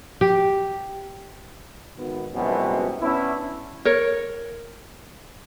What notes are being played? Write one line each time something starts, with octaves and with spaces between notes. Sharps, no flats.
G4
G#1 B3
C#2 F#2 B2 E3 G3 C4
B3 C#4 D4 E4
A#4 C#5